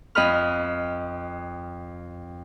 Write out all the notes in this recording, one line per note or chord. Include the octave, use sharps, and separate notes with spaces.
F2 D#5 B5 F6